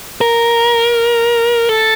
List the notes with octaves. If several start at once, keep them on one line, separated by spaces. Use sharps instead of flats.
A#4
A4